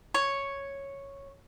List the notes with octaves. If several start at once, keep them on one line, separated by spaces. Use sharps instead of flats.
C#5